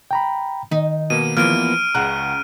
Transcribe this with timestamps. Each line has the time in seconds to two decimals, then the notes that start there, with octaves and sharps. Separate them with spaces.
0.11 G5 A#5 B5
0.71 D#3 D#4
1.10 B2 A#3 D#7
1.37 E2 E3 F3 A#3 B3 F6 D7 D#7
1.95 C#2 C#3 F#5 A#5 F#6